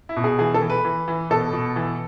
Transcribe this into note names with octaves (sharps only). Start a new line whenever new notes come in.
E4
B2
G#4
E3 G#4
A4
E3
B4
E3
E3
B2 A4
B2
E3